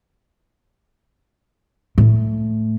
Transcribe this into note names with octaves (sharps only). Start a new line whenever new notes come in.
A2